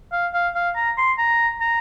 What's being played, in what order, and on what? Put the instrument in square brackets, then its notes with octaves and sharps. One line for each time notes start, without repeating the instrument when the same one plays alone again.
[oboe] F5
F5
F5
A#5
C6
A#5
A#5